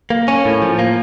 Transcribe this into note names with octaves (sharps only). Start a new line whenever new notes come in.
A#3
C#4
A2
F3
A#3